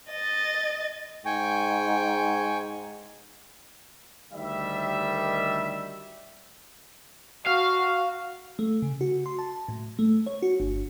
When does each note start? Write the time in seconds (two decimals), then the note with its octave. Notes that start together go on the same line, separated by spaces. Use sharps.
0.11 D#5 A6
1.26 G#2 G5 G#5 C#6
4.33 D2 D#3 G3 E5
7.46 F#4 F5
8.59 A3
8.82 C#3
9.01 F#4
9.26 C6
9.39 A5
9.68 A2
9.99 A3
10.26 C#5
10.42 F#4
10.60 G1